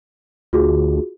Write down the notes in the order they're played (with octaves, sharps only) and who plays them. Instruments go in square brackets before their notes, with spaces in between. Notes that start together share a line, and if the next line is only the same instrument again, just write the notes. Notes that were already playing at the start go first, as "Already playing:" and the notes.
[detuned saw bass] D2 [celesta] F4 F#4 G#4